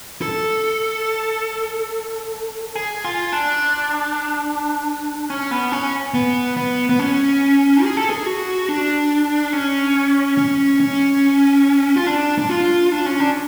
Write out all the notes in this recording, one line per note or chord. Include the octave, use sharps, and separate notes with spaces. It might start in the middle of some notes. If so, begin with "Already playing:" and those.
A4
G#4
F4
D4
C#4
B3
C#4
B3
B3
B3
C#4
G#4
A4
G#4
F#4
D4
C#4
C#4
C#4
F4
D4
D4
F4
D4
C#4
D4